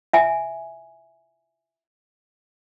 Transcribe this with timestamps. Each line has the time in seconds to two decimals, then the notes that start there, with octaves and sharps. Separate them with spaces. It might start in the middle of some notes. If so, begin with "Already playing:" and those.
0.13 E5 G#5